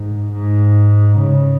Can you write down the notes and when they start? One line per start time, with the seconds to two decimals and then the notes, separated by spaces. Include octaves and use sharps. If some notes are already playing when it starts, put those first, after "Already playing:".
Already playing: G#2
0.33 G#2
1.19 C#3